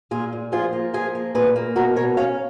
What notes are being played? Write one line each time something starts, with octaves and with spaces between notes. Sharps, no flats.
A#2 F4 G#4
A#2
F3 F4 G#4
A#3
F3 F4 G#4
A#3
A#2 G#4 B4
A#3
B2 F#4 A#4
B2 A#4 C#5
C#4 C#5 F5